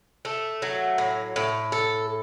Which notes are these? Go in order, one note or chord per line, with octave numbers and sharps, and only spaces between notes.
A3
F#3
A2
A2
A4